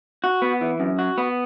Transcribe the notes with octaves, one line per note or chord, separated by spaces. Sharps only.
F#4
B3
E3
F#2
F#4
B3